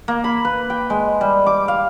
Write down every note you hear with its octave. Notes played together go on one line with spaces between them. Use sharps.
A#3
B5
B4
G5
G#3
G3
D6
F5